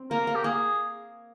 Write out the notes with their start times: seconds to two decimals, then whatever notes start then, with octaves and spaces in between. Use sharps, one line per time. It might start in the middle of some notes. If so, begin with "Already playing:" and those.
Already playing: C4
0.11 A#3 A#4
0.27 A#3
0.35 G4
0.44 A#3 G#4